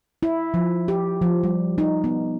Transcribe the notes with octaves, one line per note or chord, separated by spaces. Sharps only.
E4
F3
G4
F3
G3
D#4
B3